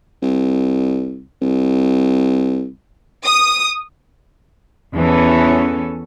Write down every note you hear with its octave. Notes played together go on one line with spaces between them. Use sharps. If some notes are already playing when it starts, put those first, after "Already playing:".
C2
C2
D#6
E2 E3 B3 C#4 A4